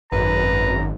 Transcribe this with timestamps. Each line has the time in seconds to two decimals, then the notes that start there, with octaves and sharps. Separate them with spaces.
0.12 G#1 F#2 B4 A#5